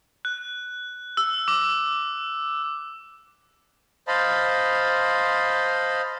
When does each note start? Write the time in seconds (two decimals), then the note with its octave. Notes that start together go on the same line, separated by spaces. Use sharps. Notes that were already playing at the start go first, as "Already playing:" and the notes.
0.25 F#6
1.17 E6
1.48 D6
4.08 C5 D#5 F5 A5 B5